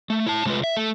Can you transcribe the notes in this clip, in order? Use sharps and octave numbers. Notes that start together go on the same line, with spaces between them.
A3
E4 A5
C3 G#3 A3 F4 B4
E5
A3